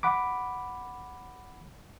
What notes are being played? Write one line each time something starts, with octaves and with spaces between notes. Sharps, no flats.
F#5 B5 D6